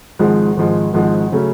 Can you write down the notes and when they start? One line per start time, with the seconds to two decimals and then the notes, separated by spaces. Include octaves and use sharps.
0.19 G#1 G#2 F3 G#3
0.57 G#1 G#2 F3 G#3
0.94 G#1 G#2 F3 G#3
1.32 C#3 F#3 A3 C#4